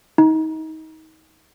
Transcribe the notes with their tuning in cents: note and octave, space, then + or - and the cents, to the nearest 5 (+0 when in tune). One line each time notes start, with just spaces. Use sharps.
D#4 +30